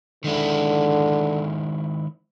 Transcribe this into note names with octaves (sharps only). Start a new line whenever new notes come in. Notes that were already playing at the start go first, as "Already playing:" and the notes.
D3 D#3 G#3 E4